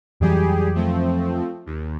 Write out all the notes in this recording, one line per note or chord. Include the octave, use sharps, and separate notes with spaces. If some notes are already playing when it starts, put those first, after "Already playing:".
F2 E3 F#3 G3 G4 G#4
F3 A3 C4
D#2